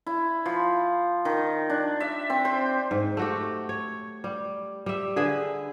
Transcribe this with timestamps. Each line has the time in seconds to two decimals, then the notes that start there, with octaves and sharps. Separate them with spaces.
0.07 E4
0.46 F3
1.25 D#3
1.70 D4
2.00 E5
2.30 C4
2.45 C5
2.91 G#2
3.17 A3 F#4 G4
3.69 C#5
4.24 G3
4.86 G3 E5
5.16 D3 G#4 B4 E5